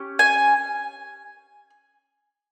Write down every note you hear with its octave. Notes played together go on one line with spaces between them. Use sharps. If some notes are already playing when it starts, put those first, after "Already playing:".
Already playing: C#4 G4
G#5